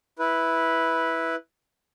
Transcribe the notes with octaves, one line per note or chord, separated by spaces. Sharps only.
E4 B4